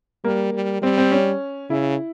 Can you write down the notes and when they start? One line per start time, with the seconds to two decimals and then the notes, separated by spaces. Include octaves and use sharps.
0.24 G3 A#3
0.53 G3
0.82 G3 C4
0.98 C4
1.12 C#4
1.70 C#3 E4